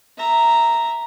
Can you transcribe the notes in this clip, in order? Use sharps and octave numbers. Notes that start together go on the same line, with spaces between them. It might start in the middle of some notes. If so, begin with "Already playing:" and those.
E5 A#5